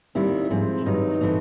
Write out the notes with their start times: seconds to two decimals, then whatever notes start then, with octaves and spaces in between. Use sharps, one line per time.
0.15 D#2 D#3 G3 C4 E4
0.50 G#2 F3 G#3 C4
0.86 G2 D#3 F#3 D#4
1.21 E3 A3 C4